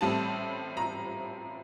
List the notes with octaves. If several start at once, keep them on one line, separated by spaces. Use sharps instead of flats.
A1 A2 G3 C4 A5
A#5